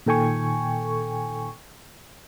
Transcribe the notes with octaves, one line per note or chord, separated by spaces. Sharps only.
A#2 D#3 A4 G5 G#5 C#6